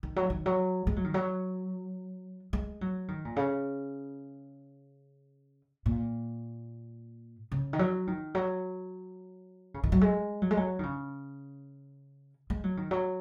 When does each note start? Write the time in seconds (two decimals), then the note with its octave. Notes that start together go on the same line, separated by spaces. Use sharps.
0.03 D#3
0.16 F#3
0.30 D#3
0.46 F#3
0.87 G#3
0.96 F#3
1.04 D#3
1.14 F#3
2.53 G#3
2.81 F#3
3.08 D#3
3.25 A#2
3.36 C#3
5.86 A#2
7.52 C#3
7.73 D#3
7.79 F#3
8.07 D#3
8.35 F#3
9.74 C#3
9.84 D#3
9.92 F#3
10.01 G#3
10.42 F#3
10.51 G#3
10.57 F#3
10.79 D#3
10.83 C#3
12.50 G#3
12.64 F#3
12.77 D#3
12.91 F#3